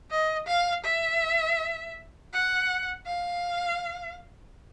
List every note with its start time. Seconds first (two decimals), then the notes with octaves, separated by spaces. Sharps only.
0.11 D#5
0.47 F5
0.84 E5
2.33 F#5
3.07 F5